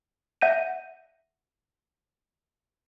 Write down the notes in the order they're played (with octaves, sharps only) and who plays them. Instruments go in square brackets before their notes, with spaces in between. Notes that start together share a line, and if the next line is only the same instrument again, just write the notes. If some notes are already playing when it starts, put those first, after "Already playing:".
[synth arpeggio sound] E5 F#5 G6 A#6 D#7